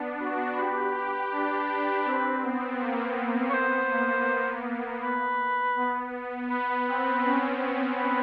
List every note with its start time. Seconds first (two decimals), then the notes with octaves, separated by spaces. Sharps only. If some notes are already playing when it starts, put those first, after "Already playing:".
Already playing: B3 D4
0.20 F#4
0.57 G4 B4
0.94 G4
1.32 D4
2.05 C4
2.43 B3
2.80 A#3
3.17 B3
3.50 C#5
3.54 B3 C5
3.91 A#3
4.28 A#3
4.65 B3
5.02 B4
5.76 B3
6.50 B3 B4
6.87 C4
7.24 C#4
7.98 B4